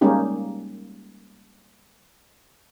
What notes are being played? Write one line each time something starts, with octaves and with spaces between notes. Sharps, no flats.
G3 G#3 A#3 C#4 D#4 G4